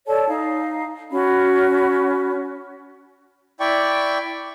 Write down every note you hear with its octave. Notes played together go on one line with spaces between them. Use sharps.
A4 C#5 D5 A5
D#4 F5
C#4 F#4 B5
E4 D5 G5 C#6